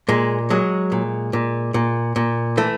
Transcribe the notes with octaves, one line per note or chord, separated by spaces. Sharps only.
A#2 G#3
F#3 G#3
A#2
A#2
A#2
A#2
E3 A3